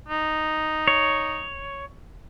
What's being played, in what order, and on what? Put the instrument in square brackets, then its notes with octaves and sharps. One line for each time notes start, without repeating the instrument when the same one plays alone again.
[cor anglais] D#4
[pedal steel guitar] C#5